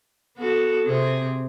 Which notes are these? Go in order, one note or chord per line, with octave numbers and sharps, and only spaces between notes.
B3 F#4 A4
C3 C4 G#4